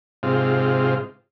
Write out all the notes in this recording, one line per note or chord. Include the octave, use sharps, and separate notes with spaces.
G#2 C3 F4